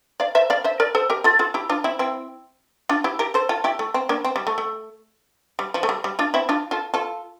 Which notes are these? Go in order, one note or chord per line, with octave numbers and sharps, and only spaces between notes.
D5 F5
C5 E5
D5 F5
C5 E5
A#4 D5
A4 C5
G4 A#4
F4 A4
F4 A4
E4 G4
D4 F4
C4 E4
C4 E4
D4 F4
E4 G4
G4 A#4
A4 C5
F4 A4
E4 G4
A3
C4
A#3 D4
C4
G3
A3
A3
G3
F3
A3
G3
G3
D4 F4
C4 E4
D4 F4
F4 A4
F4 A4